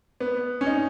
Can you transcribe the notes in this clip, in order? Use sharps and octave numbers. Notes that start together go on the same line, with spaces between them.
B3
C#4
D#4